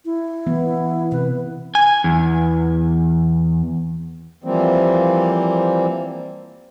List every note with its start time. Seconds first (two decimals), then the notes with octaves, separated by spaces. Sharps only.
0.05 E4
0.46 E3 B3
1.12 C3 B4
1.75 G#5
2.04 E2
4.44 E3 F3 G3 A#3 C4